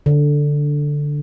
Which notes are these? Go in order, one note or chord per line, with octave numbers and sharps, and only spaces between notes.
D3